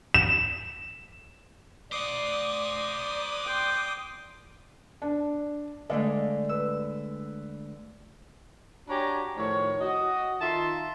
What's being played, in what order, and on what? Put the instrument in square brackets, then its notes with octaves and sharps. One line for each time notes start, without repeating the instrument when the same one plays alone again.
[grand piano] E7
[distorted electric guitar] C5 F#5 [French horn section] D5 [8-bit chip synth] D6 D#6
[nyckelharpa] G5 C6
[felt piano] D4
[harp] D3 G#3 A3 [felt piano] D5 D#5 F5
[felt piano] B4 [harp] E6
[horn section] D4 F#4 G4 C#5 G#5 A#5
A2 D#3 F3 C#5
F#4 D#5
D#3 F4 E5 A5 C6